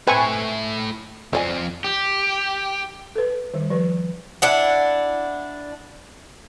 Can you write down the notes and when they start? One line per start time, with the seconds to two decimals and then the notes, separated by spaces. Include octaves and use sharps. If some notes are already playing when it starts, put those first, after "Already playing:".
0.07 A3 C4 E4 B4 G#5 C#6
1.33 F2 F3 C5 D5 G#5
1.84 G4
3.16 A4 B4
3.54 D#3 G3
3.70 F3 B4
4.42 D4 E4 F#5